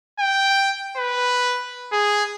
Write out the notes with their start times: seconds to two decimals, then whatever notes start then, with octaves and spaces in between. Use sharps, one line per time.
0.20 G5
0.97 B4
1.92 G#4